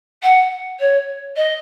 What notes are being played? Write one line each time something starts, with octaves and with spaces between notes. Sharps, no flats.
F#5
C#5
D#5